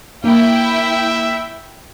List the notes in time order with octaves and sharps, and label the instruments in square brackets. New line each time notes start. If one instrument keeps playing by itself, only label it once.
[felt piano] A#3 [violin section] E4 G5 [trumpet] E5